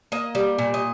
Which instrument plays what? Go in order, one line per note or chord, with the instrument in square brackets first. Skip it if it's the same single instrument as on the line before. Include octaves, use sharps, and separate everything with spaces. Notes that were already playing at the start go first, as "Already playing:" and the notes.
[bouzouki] A#3 D#5
G3
A#2
D#5